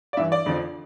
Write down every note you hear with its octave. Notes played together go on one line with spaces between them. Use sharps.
D5
G2 E3 E5
D5
F2 D3 F3